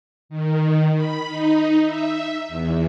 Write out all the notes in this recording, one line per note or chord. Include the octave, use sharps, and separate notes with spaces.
D#3
B5
D#4
E5
E2